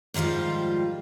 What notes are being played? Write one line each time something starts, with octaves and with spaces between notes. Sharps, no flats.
G#2 D#3 F3 G3 F4